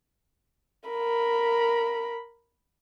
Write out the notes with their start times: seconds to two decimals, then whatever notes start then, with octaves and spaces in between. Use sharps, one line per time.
0.89 A#4 B5